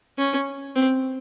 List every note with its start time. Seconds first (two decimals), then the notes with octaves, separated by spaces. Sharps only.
0.18 C#4
0.75 C4